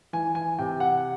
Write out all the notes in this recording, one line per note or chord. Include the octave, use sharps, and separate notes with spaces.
E3 G#5
G#5
C3 G5
F#5